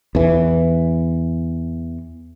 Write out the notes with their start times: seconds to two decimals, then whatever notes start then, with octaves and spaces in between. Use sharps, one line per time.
0.15 E2 E3